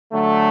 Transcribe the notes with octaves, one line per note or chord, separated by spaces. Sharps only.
D3 F#3 A3